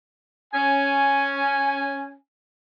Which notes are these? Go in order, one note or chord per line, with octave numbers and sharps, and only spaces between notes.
C#4 G#5